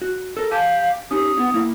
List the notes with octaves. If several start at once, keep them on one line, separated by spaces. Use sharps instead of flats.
F#4
A4 A#4
G4 F5 G#5 A5
C#4 D#4 G4 D#6
B3 E4
A#3 E4